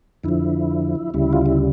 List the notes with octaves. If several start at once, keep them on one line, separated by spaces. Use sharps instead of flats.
F2 D3 F3 E4
D2 C#3 G3 E4
F4
E4